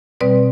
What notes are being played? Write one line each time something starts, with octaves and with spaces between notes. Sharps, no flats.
B2 G3 C4 B4 D5